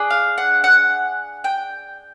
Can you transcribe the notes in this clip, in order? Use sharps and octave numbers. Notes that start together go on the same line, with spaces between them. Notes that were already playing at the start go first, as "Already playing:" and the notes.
Already playing: D4 G#4
F5
F#5
F#5
G5